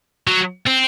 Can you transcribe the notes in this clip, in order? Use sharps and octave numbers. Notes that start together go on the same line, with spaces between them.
F#3
C4